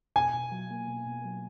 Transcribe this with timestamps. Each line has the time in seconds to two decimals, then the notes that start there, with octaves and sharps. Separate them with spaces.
0.16 B2 G#5
0.34 B2
0.52 F#3
0.71 A#3
0.88 B2
1.07 B2
1.25 F#3